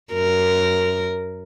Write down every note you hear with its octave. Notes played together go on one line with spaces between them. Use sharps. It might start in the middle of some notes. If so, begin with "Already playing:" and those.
F#2 A#4